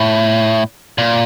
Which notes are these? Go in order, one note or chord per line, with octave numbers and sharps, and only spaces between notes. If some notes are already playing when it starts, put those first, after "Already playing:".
Already playing: A2
A#2